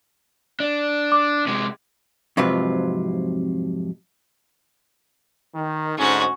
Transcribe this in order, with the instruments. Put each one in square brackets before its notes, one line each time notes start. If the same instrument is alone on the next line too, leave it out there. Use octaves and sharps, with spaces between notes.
[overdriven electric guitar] D4
[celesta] D6
[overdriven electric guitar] C3 G#3
[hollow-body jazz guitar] F2 G#2 C3 F#3 F4 B4
[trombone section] D#3
[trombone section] D2 G#2 [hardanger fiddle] C#4 F#4